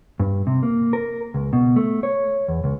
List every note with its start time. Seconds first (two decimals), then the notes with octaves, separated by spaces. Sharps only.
0.20 G2
0.47 C3
0.63 A#3
0.93 A#4
1.34 C#2
1.53 B2
1.76 A3
2.03 C#5
2.48 E2
2.64 C#2